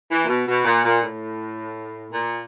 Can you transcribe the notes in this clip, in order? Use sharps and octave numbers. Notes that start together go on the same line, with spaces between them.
E3
A#2
B2
B2
A#2
A#2
A2
A#2